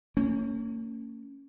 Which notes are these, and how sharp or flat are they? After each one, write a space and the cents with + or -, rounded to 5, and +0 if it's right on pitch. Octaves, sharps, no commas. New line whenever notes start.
A#3 -40 C#4 +0